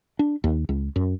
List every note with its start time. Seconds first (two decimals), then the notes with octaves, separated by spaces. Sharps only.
0.19 D4
0.44 D#2
0.69 C#2
0.96 F#2